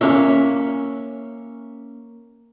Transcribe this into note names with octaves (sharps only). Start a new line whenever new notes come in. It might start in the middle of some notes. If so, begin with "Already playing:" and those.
A#3 C#4 C#5 E5